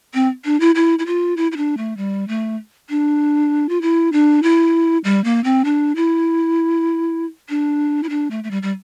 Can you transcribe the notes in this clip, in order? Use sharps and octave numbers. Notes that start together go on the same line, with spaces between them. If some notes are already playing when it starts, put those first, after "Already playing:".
C4
D4
E4
E4
E4
F4
E4
E4
D4
A3
G3
A3
D4
F4
E4
D4
E4
G3
A#3
C4
D4
E4
D4
E4
D4
A3
A3
G3
G3